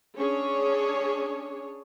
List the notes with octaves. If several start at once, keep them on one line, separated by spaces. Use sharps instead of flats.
C#4 D4 G#4 C#5